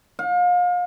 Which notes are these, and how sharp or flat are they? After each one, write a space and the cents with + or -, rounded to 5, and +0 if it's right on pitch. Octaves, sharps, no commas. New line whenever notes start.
F5 +35